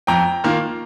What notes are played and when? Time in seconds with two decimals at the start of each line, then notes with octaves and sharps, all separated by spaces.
0.07 F2 G5 A#5
0.44 D#3 A#3 F4